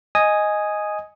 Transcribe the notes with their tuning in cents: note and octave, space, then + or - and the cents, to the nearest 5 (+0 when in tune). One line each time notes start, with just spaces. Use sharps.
D#5 +0 G#5 +0 D#6 +0